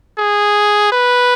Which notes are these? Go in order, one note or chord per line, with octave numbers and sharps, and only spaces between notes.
G#4
B4